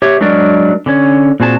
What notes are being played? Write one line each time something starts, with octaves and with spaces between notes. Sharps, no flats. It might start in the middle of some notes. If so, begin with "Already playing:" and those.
G4 C#5 E5
F#3 G#3 D4 A#4 D5
D3 C#4 C#5
A#2 C4 F#4 G#4 B4 A5